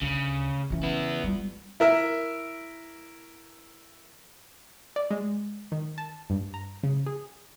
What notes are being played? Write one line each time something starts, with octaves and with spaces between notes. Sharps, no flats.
D2 C#3
C#3 E3
B3 E4
G3 F4
E4 A#4 E5
D5
G#3
D#3
A5
G2
A#5
C#3
G#4